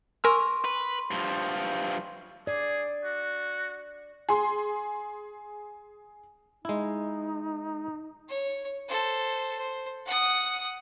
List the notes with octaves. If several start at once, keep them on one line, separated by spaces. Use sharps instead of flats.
A#4 G#5 C6 C#6 E6
B4
G2 F3
G#4 D5
F#4
G#4 C6
G#3 D#4 E4
C#5
A4 C5
C5
F#5 D#6